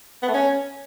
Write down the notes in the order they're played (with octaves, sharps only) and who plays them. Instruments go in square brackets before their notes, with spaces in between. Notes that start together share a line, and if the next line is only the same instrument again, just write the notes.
[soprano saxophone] B3
A3
C#4